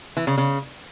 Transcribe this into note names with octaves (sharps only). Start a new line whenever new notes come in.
E3
C#3
C#3